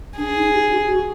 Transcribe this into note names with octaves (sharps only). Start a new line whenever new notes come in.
D4 G#4
D#4
G4
F#4
F#4